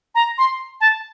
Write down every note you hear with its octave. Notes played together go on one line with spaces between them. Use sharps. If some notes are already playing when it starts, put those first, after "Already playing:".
A#5
C6
A5